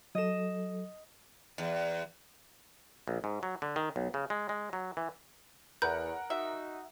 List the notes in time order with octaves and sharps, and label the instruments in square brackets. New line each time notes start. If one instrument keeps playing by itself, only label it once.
[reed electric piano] F#3 A4 [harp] D#5 E7
[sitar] E2
[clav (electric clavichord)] A#1
G#2
F#3
D3
D#3
B1
C#3
G#3
G#3
F#3
E3
[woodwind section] E2 [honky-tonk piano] A#4 F#5 [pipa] B4 [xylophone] G6
[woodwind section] D#4 F#4 [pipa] E5